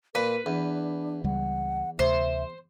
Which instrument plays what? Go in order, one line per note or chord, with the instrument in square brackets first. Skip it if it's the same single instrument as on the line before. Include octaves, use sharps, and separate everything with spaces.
[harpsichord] A#2 [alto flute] A#4 [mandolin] B4
[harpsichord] E2 [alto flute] D4
[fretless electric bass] C#2 C#3 G3 [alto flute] F#5
[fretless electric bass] D2 C3 [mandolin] C5 [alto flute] E5